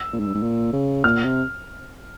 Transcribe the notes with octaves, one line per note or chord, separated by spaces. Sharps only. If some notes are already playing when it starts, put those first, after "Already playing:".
Already playing: E6
A#2
G#2
G2
G#2
A#2
C#3
A#2 F6
C3